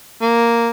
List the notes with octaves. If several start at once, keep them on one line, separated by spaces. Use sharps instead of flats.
A#3